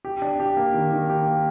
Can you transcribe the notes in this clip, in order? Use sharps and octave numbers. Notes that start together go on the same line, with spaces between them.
G4
D4
G4
A#3
D#3
D#3
G4
A#3